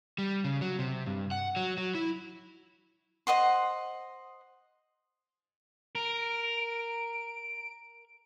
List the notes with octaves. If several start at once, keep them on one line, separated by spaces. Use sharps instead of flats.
G3
C#3
F#3
C3
G2
F#5
F#3
F#3
E4
C5 D#5 F#5 C6
A#4 D7